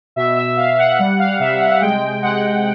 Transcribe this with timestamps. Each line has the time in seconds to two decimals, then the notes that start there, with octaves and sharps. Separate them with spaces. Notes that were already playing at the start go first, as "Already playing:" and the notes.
0.16 B2 E5
0.36 E5
0.57 B2 F5
0.78 F#5
0.98 G3 F#5
1.19 F5
1.39 C3 E5
1.61 F#5
1.71 F#5
1.81 G#3 G5
2.22 G#3 F#5